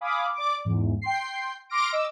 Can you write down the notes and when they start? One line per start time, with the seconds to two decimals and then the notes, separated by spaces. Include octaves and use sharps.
0.01 F5 G#5 B5 D6 D#6
0.34 D5 D6
0.65 E2 G#2
1.02 G5 C6 C7
1.70 C6 D6 F6 A#6 D7
1.92 D#5 D6 E6